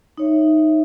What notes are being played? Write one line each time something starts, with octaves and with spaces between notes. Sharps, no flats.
D#4 C#5 E5